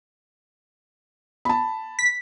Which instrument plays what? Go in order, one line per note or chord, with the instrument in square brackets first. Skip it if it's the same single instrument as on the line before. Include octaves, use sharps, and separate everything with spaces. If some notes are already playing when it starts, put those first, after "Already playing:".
[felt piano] A5 B5
[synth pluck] B6